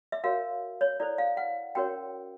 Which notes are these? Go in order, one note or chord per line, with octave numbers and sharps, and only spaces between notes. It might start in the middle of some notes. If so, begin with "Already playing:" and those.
E5
F#4 A#4 C#5 F5
C#5
E4 A4 C5 D5
F5
F#5
C#4 F#4 A#4 C#5 G5